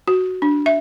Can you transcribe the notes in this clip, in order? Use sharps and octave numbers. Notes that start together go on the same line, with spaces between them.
F#4
D4
E5